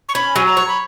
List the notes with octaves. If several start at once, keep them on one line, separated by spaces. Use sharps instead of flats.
C#6
C#4 B5
F#3 G#5
A#5
C#5
B5